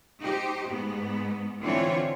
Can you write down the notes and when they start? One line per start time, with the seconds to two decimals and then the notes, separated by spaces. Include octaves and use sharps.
0.22 D#4 G4 C5
0.70 G#2 B3
1.62 D3 E3 C4 F4 C#5